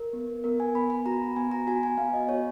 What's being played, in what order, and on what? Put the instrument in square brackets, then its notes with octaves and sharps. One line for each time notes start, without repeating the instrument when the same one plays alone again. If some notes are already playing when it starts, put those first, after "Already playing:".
Already playing: [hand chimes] A#4
B3
B3 A#4
G#5
B3 B5
B5
F#4 A#5
B3 G#5
A#5
F#4 G#5
G#5
B3 F5
D#5
F#4 C#5